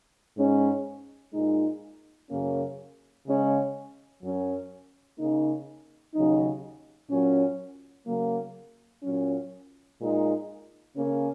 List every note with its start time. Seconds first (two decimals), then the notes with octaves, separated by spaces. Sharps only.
0.37 G#2 G#3 C#4
1.33 A#2 G#3 D#4
2.30 F#2 C#3 A#3 C#4
3.26 C#3 G#3 C#4
4.22 F#2 F#3 C#4
5.18 C#3 A#3 D#4
6.15 D#2 C#3 F#3 D#4
7.11 A#2 F#3 C#4
8.07 C#3 F#3 A#3
9.03 A#2 F#3 C#4
10.00 A#2 G#3 D#4
10.96 C#3 A#3 C#4